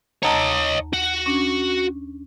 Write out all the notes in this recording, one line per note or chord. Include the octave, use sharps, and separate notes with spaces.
D#2 C#5 D#5 A5 A#5
F#4
C#4 D4